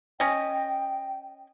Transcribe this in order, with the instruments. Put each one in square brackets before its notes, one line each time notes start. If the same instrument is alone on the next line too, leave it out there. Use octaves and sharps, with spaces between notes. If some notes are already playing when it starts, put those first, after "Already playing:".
[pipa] C#4 D#5 [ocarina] G5